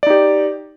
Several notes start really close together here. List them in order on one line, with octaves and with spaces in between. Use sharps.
D5 D#4 G4